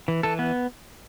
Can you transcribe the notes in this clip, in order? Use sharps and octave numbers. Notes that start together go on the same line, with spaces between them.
E3
E3 A4
B3